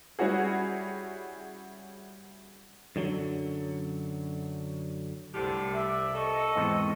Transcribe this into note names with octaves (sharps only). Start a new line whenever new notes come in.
G3 C#4 E4 F#4 G#4
F#2 D3 F#3
C2 A2 D3 G4 C5
D5 E5
A4 D#5 C#6
E2 G#2 C4